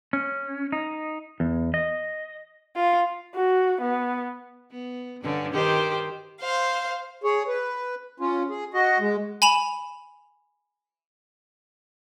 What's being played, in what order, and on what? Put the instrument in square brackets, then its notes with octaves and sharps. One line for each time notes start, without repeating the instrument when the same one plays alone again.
[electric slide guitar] C#4
D#4
E2
D#5
[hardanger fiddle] F4
[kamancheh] F#4
B3
[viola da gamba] B3
G2 D3 C#4
[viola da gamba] D#3 C5 [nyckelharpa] G4
[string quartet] C5 F5
[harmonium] G#4 C#5
B4
C#4 F4
G#4
F#4 D#5
G#3
[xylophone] G#5 B5 E7 F7